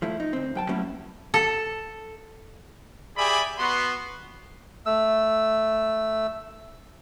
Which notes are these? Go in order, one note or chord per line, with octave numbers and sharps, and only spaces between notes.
F3 A3 E4
D#4
D2 C4
F#2 G5 A5
F#3 G3 A3 A#3 C#4 E4
A4
G4 G#4 D5 E5 G#5 B5
B3 F#4 C6
A3 E6